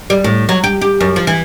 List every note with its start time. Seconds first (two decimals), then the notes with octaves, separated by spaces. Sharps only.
0.10 G3
0.24 A2
0.49 F#3
0.64 G4
0.81 G4
1.01 F#2
1.16 F3
1.27 E3